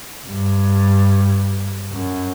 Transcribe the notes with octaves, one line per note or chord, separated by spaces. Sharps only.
G2
F#2